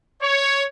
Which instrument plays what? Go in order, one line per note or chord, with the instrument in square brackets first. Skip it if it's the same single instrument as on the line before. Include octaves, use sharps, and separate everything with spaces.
[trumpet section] C#5